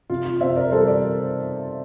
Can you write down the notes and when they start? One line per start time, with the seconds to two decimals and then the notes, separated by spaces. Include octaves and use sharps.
0.10 C3 F4
0.25 F4
0.41 C3 C5 E5
0.56 A#4 D5
0.72 G3 A4 C5
0.88 A#4 D5